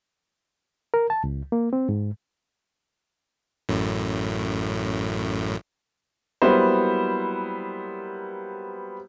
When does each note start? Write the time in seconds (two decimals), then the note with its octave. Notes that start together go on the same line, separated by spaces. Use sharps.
0.94 A#4
1.10 A5
1.24 C#2
1.52 A#3
1.73 C4
1.89 G#2
3.69 A1 F#2 A2
6.42 F#3 G3 A#3 B3 E4 C5